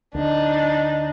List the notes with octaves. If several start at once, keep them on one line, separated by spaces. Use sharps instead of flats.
D2 D4 D#4